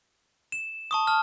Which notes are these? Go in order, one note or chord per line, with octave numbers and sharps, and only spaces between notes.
E7
A5 C#6 D#6
A5 F6